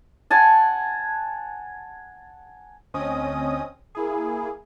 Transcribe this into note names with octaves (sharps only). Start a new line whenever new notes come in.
F#5 G#5 A5
D2 C4 C#4 D#5 D#6
A#3 E4 G#4